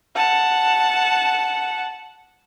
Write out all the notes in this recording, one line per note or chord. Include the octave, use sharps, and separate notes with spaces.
F#5 A5